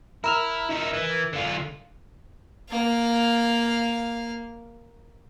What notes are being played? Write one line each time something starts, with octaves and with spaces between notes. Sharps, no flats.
E4 A#4 E6 F6
D#4 E4
E3
D3 F4
A#3 F5